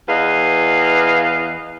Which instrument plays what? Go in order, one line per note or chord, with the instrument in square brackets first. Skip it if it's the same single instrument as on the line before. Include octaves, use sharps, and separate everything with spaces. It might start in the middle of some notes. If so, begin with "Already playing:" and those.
[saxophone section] E2 B4 D#5 F5